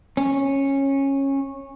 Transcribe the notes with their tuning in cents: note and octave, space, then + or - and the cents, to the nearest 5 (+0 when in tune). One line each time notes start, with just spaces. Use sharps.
C#4 -15